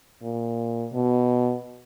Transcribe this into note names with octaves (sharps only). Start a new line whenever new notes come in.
A#2
B2